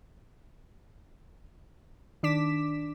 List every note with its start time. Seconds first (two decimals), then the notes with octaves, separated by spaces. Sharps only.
2.23 D#3 D4 D6 B6 E7